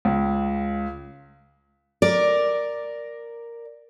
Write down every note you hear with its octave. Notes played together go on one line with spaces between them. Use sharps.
C#2
A#4 D5